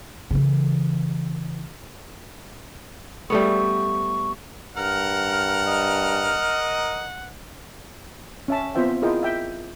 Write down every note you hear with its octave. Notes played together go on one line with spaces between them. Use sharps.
C#3 E3
G3 A3 B3 C#6
G2 A#4 F#5 F6
D#5
C#4 E5 A5
B3 C4 F4 C5 E5 G5
E4 F4 G#4 A#4 D#5 G5
E5 G5